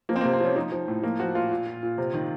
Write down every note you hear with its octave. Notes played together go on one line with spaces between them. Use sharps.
F3 A#3
C4
C3 A#3
C4
F3 C#4
F3 D#4
F3
A2
F3 A#3
F3 F#4
A#2 F4
A#2
A#2
A#2
C3
D#3